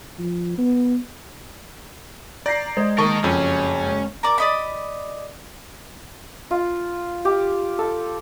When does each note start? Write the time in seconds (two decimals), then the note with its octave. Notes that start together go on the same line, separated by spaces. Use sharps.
0.19 F3
0.58 B3
2.46 D5 A#5 G6 A#6 C7
2.77 G#3 C5 D#5
2.98 D#3 A#3 A#4 D#5 A5 C#6
3.24 F#1 F2 C#4
4.23 A#4 D5
4.38 D5 D#5 B5
6.51 F4
7.25 G4
7.79 A4